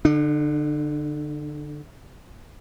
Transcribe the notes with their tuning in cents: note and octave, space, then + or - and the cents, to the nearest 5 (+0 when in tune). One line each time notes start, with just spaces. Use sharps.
D3 +0 D4 +45